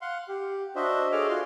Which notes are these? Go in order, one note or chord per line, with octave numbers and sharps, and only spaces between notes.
F5 F#5 C6
G4
D4 F#4 C5 D#5 E5
G#4 A4 C#5 D#5 D6 F6
F4 F#4 C6